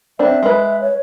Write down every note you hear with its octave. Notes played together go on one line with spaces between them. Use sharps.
C4 D4 E5
G#3 B4
C#5